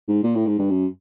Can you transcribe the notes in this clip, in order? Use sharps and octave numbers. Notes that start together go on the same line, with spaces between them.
G#2
A#2
A2
G#2
G2
F#2